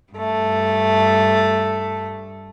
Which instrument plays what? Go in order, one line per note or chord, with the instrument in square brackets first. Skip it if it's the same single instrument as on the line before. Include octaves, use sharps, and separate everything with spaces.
[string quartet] G2 A3